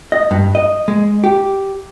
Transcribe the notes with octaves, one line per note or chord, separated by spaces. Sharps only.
D#5
G2
D#5
G#3
G4